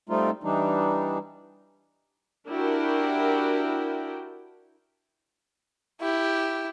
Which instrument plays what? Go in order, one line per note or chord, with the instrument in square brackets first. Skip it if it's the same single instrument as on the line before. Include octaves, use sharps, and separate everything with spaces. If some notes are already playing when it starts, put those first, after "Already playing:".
[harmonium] G3 A3 C4 D#4 F4
E3 G3 D4 D#4
[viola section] D4 E4 F#4 G4 A#4 G5
[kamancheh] E4 G4